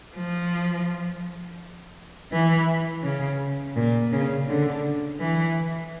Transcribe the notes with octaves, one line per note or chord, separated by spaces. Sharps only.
F3
E3
C#3
A#2
C#3
D3
E3